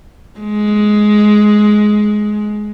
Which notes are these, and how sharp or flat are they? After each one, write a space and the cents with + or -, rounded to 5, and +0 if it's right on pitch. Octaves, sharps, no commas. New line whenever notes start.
G#3 +15